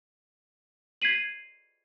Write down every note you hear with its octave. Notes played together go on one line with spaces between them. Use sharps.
G#6 B6 C7 D#7 F#7